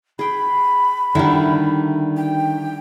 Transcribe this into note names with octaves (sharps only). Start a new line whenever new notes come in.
G#4 G5 B5
D3 D#3 G3 E4
G5